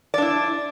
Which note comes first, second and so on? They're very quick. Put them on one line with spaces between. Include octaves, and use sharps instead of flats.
D5 D4 E4